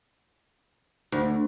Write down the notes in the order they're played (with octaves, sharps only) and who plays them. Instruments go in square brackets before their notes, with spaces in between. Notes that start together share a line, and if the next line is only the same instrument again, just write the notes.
[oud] D2